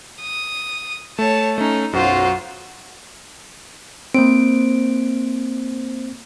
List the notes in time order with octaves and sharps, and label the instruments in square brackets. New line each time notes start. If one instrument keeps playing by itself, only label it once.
[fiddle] D#6
[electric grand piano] A3 [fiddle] C#5 A5
[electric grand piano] A3 C#4 [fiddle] D#4
[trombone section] B1 F#3 F#4 [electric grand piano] F#2 [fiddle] F4 C5
[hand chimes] A#3 C5 D7 [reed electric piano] C4